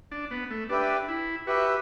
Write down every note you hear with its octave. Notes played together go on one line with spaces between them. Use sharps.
D4
B3
A3
D4 G4 B4 E5 G5
E4
F#4 G4 B4 E5 G5